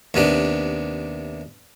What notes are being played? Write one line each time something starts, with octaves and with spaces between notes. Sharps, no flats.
D#2 C3 B3 D4